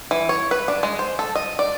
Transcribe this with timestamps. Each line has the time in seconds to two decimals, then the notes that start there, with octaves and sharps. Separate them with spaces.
0.11 E3
0.29 C#5
0.51 B4
0.68 D4
0.83 G#3
0.99 C5
1.19 A4
1.35 D#5
1.59 D5